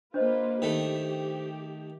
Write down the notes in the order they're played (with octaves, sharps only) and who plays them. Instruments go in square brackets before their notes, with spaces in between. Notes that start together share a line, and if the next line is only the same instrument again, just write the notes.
[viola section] A#3 F4 B4 [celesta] D4 C5 D#5
[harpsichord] D#3 A3 [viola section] G4